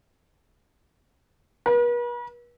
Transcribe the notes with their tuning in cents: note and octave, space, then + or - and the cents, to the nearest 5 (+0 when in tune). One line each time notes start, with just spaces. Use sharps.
B4 -45